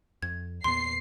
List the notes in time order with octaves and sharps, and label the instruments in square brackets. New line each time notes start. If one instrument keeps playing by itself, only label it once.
[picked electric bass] F2 [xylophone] G#6
[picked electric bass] E2 A#2 B3 [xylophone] C6 [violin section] C7